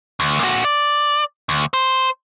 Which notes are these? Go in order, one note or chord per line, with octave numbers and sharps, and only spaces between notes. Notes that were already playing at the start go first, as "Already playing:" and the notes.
D2
A#2 F#4
D5
D2
C5